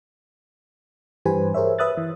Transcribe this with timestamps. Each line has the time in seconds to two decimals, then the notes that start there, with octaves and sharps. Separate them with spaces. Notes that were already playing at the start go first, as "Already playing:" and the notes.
1.25 G2 E3 G4 B4 C5 G#5
1.54 G#4 A#4 C5 C#5 E5
1.79 B4 E5 D#6 F#6 A6
1.97 E3